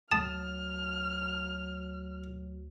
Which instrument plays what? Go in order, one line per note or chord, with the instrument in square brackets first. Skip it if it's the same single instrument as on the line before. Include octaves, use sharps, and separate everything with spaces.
[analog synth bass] D2 [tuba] F#3 [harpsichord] A5 D#6 [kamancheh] F6